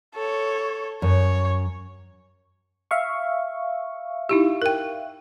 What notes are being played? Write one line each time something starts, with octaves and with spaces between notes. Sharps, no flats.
A4 C#5
F#2 C#5
E5 F5 C#6
D#4 E4 G4
A#4 G5